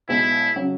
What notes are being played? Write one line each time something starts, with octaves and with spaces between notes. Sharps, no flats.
B1 B2 G#3 B3 E4
C#3 F#3